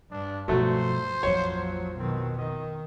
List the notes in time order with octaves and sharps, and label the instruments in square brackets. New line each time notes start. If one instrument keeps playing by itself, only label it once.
[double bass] G2 [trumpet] D4
[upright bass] B2 F3 [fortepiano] F#3 A3 [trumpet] C5
[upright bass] A#1 F2 [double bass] F3 F#3 [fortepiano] C#5
[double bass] B2 D#3 [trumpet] C4
[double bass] D#3 [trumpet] D#5